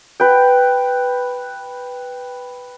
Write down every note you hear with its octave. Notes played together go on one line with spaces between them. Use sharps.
B4 G5